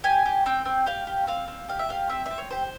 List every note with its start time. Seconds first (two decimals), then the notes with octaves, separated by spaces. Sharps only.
0.04 G4 G#5
0.25 G4
0.46 C4 G5
0.65 C4
0.86 G4 F5
1.07 G4
1.27 C4 F5
1.48 C4
1.68 G4 F5
1.79 E5
1.89 G4 F5
2.09 C4 E5
2.26 E5
2.31 C4
2.38 C#5
2.51 G4 C5